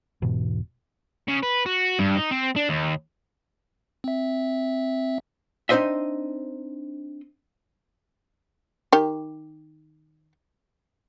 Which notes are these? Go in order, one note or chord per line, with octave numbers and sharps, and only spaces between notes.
E1 G#2 B2 E3
C#3
B4
F#4
G2
D#4
C4
D4
D#2
C4 E5
C4 D4 D#4 C5 D#5 E5
D#3 G4